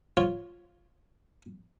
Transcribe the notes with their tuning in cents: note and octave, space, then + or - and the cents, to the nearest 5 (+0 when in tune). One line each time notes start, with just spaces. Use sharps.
F4 +0 C#5 +0